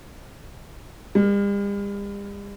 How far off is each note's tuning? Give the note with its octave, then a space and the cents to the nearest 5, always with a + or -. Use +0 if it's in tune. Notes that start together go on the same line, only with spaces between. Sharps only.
G3 +45